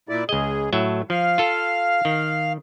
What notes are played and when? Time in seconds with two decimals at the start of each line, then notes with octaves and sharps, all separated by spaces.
0.09 A#2 E4 D5
0.29 C#2 G#4 D#5
0.73 A2 F#3 A3 E5
1.10 F3 F5
1.38 F4 A4
2.05 D#3